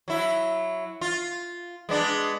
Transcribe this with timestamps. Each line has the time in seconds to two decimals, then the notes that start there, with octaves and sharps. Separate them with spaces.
0.08 F#3 E4
1.01 F4
1.89 G#3 B3 D4